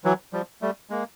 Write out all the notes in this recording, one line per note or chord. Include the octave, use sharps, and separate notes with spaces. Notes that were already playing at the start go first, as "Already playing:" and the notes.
E3 F#3
F3 G3
G3 A3
G#3 A#3